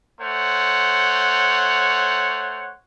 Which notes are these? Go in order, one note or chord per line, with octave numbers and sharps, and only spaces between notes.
A3 C5 C#5 F#5